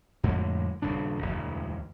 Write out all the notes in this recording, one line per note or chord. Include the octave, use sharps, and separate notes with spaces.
F2 A2 D3 G#3
D#1 G2 C#3 D4
E1 D2 G2